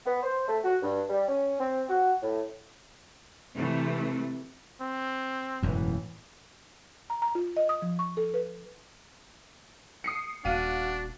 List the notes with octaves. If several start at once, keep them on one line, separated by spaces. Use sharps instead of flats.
B3
C5
A3
F#4
G2
G3
C#4
C4
F#4
A2
C3 E3 A3
C4
E1 F#2 A2 E3
A#5
A#5
F4
D#5
D#6
F3
C#6
A4
B4
D#6 C7 C#7
D#1 D4 F#4 F5 D#7